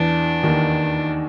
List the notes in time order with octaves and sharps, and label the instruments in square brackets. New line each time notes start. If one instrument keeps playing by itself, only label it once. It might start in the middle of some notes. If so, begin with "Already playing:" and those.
Already playing: [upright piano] E2 E3 [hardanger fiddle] D4
[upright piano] D#2 D#3